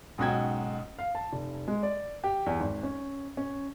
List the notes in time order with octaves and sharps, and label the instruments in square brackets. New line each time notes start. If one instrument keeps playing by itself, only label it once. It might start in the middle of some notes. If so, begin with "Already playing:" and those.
[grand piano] B1 G#2 C#4 F#4 G5 G#6
[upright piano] F5
A5
F1
G#3
D5
G4
E2
G#1
C#4
C#4